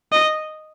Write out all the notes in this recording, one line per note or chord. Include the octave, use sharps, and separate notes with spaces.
D#5